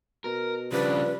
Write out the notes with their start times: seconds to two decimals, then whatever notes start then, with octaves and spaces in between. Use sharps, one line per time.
0.24 B2 A#4
0.72 C#3 F3 G3 D4 B4